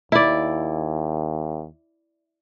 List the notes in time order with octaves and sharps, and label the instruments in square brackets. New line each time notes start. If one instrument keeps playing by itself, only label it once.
[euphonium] D#2 [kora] E4 D5